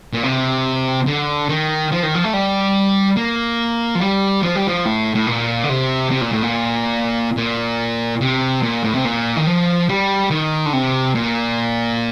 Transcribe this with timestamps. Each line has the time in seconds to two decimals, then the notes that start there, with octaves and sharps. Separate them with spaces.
0.13 A#2
0.23 C3
1.07 D3
1.49 D#3
1.92 F3
2.03 D#3
2.15 F3
2.24 A3
2.33 G3
3.17 A#3
3.95 F3
4.01 G3
4.43 F3
4.55 G3
4.67 F3
4.85 A2
5.15 A2
5.27 A#2
5.64 D3
5.69 C3
6.11 C3
6.21 A#2
6.32 A2
6.43 A#2
7.37 A#2
8.21 C3
8.63 A#2
8.84 A2
8.95 C3
9.05 A#2
9.36 D#3
9.47 F3
9.89 G3
10.30 D#3
10.66 D3
10.73 C3
11.15 A#2